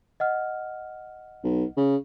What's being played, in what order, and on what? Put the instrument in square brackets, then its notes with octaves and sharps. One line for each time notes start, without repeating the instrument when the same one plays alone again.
[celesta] D#5 F#5 F6
[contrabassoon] B1
C#3